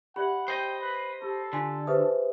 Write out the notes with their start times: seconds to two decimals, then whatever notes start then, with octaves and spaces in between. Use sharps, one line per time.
0.16 G4 D5 E5 F#5 B5
0.48 C5 D#5 G5 D#6
0.81 B4
1.22 G4 A4
1.53 D3 F4 G#5 C6
1.87 G4 G#4 B4 C5 E5 D#6